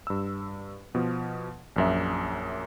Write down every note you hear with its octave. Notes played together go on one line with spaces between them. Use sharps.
G2 E6
B2 F3
A#1 F#2 E5